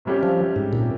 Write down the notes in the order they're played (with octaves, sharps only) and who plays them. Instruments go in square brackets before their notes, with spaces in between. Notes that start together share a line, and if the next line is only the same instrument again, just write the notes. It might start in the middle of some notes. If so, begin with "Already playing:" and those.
[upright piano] C3 G3 C#4 G4
[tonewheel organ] F3
G#2
A#2